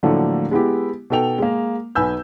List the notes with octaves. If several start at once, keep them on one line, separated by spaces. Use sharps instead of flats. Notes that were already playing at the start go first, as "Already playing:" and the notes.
A2 D3 F3 F#3 A3 A#3
G#3 B3 E4 G4
B2 D#4 A4 G5 F7
G#3 A#3
B1 B4 G#5 E6 G6